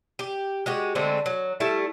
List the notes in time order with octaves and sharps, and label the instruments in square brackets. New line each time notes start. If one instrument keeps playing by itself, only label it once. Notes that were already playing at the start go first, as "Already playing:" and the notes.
[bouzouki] G4
G#3 F#4 G4
D3 G#3 A3 C4
F#3
G3 A3 E4 A5